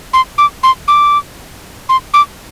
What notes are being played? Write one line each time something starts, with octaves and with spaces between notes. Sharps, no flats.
C6
D6
C6
D6
C6
D6